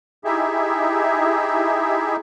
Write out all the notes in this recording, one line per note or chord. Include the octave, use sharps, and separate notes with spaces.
D#4 E4 G4 G#4 E5